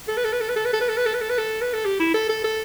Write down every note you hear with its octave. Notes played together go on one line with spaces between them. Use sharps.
A4
B4
A4
B4
A4
B4
A4
B4
A4
B4
A4
B4
A4
B4
A4
B4
A4
B4
A4
G4
E4
A4
A4
A4